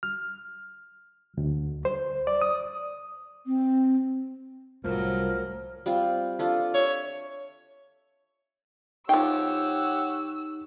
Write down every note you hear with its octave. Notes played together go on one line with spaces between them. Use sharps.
F6
D2
C5
D5
D#6
C4
C2 A2 F3 F#3 A3 A#4 F6
G3 C4 F4
D4 F4 A4
C#5 E5
F3 D#4 G4 C#5 F#5 G5 E6